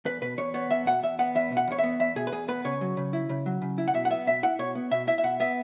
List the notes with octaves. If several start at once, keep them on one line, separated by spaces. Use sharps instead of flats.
E2 B4
B2 B4
E2 C#5
B3 C#5
E2 E5
B2 F#5
E2 E5
B3 F#5
E2 E5
B2
F#5
E2 C#5
E5
B3
E2 E5
B2 G#4
B4
E2 G#4
B3 B4
C#3 C#5
F#3
C#3
E4
C#3
F#3
C#3
E4
F#5
B2 E5
F#5
B3 E5
B2 E5
E4 F#5
B2 C#5
B3
B2 E5
E4 E5
E5
B2 F#5
B3 E5